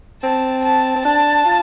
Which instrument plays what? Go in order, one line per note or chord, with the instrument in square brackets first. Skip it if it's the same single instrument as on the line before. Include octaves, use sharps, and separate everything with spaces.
[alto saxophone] C4 [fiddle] A5
[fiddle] A5
[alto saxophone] C4
[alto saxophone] D4 [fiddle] A5
[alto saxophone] F4